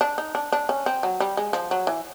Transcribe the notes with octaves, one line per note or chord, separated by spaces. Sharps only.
D4
D#4
D4
D4
C#4
C4
F#3
G3
G#3
F3
F#3
E3